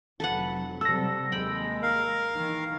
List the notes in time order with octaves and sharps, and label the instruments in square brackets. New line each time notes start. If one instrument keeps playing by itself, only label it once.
[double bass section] F1 F#3 [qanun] A4 B4 F#5
[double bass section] C3 F#3 G3 [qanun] A4 [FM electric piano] E6 A#6
[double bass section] D#2 G#3 [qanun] G5 B5
[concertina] A#4 F5
[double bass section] D#3 E3